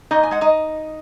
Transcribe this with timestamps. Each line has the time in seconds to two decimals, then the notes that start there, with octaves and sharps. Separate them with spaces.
0.11 A#2 D#4 D#5
0.23 G#5
0.31 G#3 F#5
0.41 D#4 D#5